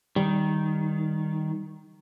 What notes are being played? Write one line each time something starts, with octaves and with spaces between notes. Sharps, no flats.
D#3 G3